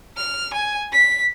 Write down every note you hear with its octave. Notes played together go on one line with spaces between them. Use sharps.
F6
G#5
B6